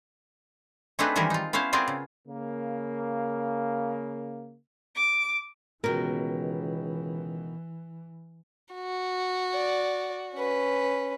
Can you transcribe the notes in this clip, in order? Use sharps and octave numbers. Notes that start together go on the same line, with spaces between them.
A3 C4 D4 D#4 G#4 B4
D#3 E3 G3 G#3 G#4 A#4
D#4 F4
B3 C#4 E4 C5 F5
B3 C4 F4 G#4 A#4 D5
C#3
C#3 A#3
D6
C#2 B2 D#3 E3 A#4
F#4
D5
C#4 B4